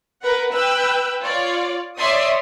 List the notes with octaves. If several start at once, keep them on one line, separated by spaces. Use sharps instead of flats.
A#4 B4 F#5
B4 G5 E6 F#6
F4 C#5 D5
C#5 D5 E5 C6 D#6